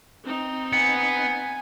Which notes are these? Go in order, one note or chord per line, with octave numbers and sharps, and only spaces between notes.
C4 D#4
B3 G#5 C#7